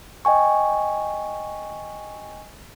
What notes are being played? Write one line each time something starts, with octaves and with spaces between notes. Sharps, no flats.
D#5 G5 G#5 C#6